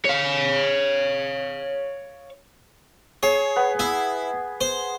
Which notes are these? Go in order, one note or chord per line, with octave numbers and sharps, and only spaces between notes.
C#5 F5
G#4 C#5
B3
E4
C5